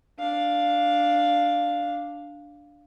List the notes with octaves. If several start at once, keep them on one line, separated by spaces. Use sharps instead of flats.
D4 F5